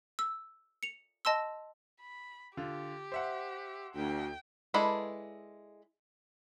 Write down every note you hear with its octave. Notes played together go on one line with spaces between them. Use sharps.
E6
C#7 F7
D#5 A5 C6 E6
B5
D3 F4 G4
C5 E5 F#5
D2 G5
G#3 E4 A4 B4 D5